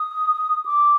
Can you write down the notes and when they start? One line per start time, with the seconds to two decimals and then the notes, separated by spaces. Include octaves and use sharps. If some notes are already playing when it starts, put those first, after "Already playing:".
Already playing: D#6
0.66 D6